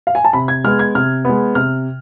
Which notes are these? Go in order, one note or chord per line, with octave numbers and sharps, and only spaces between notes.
F5
G#5
A5
C3 B5
G#6
G#3 B3 F6
G#6
C3 F6
G#3 B3
C3 F6